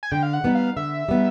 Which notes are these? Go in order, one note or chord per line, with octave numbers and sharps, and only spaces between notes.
G#5
D3 G5
F5
F#5
G3 B3 D#4
F5
D3 E5
G3 B3 D#4